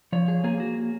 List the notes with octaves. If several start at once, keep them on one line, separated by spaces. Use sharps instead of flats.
F3 C#5
G#4
A#3 G#4
F#4